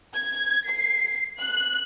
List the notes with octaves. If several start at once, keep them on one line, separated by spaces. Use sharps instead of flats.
G#6
C7
F#6